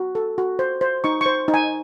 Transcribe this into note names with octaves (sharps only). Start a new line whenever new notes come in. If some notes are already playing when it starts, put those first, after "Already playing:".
Already playing: F#4
A4
F#4
C5
C5
D#4 C#6
C5 C#6
D#4
G#5